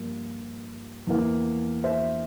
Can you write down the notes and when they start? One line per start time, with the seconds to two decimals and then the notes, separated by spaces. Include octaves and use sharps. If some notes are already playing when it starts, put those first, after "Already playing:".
Already playing: G2 F3 A#3
1.07 E2 E3 A#3
1.84 C5 E5